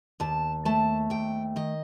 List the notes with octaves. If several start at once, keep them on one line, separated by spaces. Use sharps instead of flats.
D#2 A5
A3 A5
D#2 G5
D#3 D#5